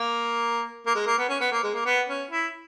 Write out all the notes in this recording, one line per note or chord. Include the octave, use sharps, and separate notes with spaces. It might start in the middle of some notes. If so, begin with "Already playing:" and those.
Already playing: A#3
A#3
G#3
A#3
B3
C#4
B3
A#3
G#3
A#3
B3
C#4
E4